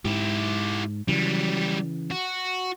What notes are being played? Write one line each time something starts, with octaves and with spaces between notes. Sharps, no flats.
G#2 E4 G4
C#3 E3 F#3 G3
F#4